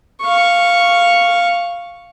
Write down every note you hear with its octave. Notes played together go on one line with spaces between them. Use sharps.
F5 C#6